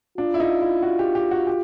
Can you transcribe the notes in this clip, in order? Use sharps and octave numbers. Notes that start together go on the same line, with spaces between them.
D4 F4
E4
D#4
E4
F#4
G4
G4
F#4
G4